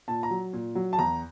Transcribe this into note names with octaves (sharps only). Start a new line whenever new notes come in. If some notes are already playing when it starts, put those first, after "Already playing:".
A#2 A5
A#5
F#3
A#2
F#3
A5
E2 A#5